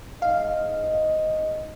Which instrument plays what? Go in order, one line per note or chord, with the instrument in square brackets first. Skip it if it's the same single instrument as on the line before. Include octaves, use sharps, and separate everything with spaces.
[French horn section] G#2 D#5 [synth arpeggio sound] F5